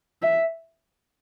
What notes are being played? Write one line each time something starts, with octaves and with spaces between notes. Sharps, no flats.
E5